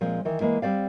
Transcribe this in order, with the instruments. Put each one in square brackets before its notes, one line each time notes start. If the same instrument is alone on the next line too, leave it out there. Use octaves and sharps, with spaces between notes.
[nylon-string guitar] A#2 F3 G#3 C4
D#3 E3
E3 G#3 A#3 E4
G3 C4 D5 F5